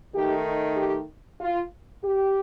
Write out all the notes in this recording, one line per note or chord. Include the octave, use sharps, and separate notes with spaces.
D#3 A3 D#4 G4
G4
F4
G4